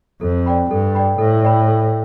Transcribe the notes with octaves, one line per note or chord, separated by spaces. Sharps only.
F2 A4
D5 G5 B5
G2 A4
D5 G5 B5
A2 A4
D5 G5 B5
A4